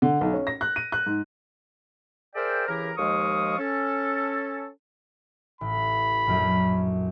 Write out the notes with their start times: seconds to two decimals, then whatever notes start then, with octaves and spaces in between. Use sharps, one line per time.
0.02 D3
0.21 B1
0.33 C#4
0.47 A#6
0.61 F#6
0.76 D#7
0.92 F#6
1.06 G#2
2.36 G#4 A#4 C5 D5 E5 G5
2.68 C#3 E3 E4 G4 A#4
2.98 D#2 F3 G#3 F5 C#6 D#6
3.58 C#4 A4
5.61 A1 B5
6.27 A#1 F#2 F#3